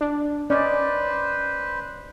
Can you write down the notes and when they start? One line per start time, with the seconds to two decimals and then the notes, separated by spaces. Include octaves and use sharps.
0.01 D4
0.50 C#4 B4 C5 D5 D#5